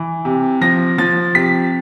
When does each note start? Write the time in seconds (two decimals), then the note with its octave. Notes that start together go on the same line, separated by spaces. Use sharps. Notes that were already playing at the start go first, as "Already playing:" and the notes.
Already playing: E3
0.25 C3
0.61 F3 A#6
0.98 F3 A6
1.35 C3 B6